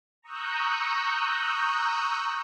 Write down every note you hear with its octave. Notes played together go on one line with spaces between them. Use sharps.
A#5 C#6 D#6 E6 F#6 G6